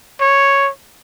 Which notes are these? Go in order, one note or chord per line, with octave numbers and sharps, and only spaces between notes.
C#5